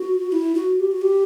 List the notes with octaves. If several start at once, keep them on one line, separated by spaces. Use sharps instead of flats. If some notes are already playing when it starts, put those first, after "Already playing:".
Already playing: F#4
F#4
E4
F#4
G4
F#4
G4